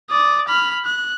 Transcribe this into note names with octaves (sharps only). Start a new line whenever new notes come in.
D5 D#6
B5 F6
F#6